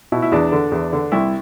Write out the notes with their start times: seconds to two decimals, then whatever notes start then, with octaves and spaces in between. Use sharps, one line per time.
0.12 B2 E4
0.22 E4
0.32 E2 D4
0.52 D3
0.72 E2
0.93 D3
1.12 C2 E4